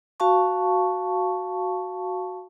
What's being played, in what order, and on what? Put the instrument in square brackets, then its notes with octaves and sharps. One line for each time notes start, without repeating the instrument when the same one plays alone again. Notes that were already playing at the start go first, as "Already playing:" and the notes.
[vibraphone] F#4 F5 A5 C#6